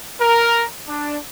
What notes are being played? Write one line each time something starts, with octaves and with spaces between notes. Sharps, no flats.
A#4
D4